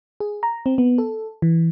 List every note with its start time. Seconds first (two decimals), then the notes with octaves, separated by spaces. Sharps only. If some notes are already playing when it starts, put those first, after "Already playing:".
0.20 G#4
0.43 A#5
0.66 C4
0.78 B3
0.98 A4
1.42 E3